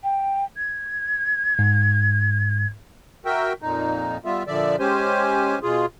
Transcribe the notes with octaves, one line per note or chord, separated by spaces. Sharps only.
G5
G#6
G#2
F#4 A#4 E5 G5
F2 A#2 D#4
G3 B3 F4 E5
A#2 D3 F3 D5 E5
G#3 C#4 G4 C5 G#5
B2 F4 G#4